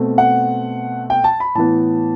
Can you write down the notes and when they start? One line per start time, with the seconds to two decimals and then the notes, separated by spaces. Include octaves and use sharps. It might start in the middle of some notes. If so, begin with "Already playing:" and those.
Already playing: B2 A3 C4
0.18 F#5
1.10 G5
1.24 A5
1.40 B5
1.55 A2 E3 B3 A5